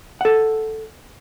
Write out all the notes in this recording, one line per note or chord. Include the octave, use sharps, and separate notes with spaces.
A4 F#5